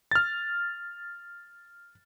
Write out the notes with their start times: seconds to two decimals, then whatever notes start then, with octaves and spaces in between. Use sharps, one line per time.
0.11 F6 A6